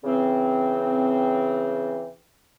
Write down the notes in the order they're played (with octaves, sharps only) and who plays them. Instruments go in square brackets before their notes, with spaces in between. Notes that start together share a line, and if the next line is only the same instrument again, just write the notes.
[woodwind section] C#3 E3 C4